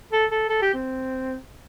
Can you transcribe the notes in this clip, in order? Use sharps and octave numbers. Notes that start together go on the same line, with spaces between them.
A4
A4
A4
G4
C4